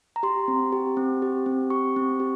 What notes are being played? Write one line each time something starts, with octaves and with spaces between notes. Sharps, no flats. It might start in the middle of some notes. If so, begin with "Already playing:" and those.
A#5
G4 C6
C4
G4
C4
G4
C4
G4 C#6
C4
G4